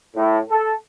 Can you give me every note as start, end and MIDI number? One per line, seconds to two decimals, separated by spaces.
0.16 0.39 45
0.50 0.73 69